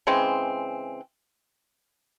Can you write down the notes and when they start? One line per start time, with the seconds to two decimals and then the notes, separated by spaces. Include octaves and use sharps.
0.07 C#3 E3 G#3 C4